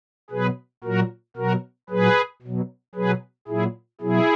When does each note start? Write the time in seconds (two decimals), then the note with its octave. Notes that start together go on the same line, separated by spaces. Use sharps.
0.30 B2 F#3 G#4 B4
0.84 A#2 F#3 F#4 A#4
1.37 B2 F#3 F#4 A#4
1.89 A#2 F#3 G#4 B4
2.42 B2 F#3
2.95 B2 F#3 G#4 B4
3.48 A#2 F#3 E4 G#4
4.01 B2 F#3 E4 G#4